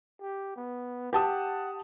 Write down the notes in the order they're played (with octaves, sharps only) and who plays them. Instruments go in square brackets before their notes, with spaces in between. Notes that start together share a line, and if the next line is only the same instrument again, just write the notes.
[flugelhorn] G4
B3
[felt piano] G4 A5 D#6 [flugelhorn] F#5